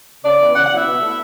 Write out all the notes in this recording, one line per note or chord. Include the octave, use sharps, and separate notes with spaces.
C#3 D5
E3 B3 E4
C#3 F#5
F#5
F#3 B3 E4 E5
B2
A3 E4